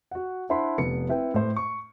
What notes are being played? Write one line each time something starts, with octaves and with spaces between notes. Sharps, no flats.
F#4 F#5
D4 E4 C5 F#5 B5 C6
F1 B3 C#7
C4 E4 B4 G5
A2 C5
C#6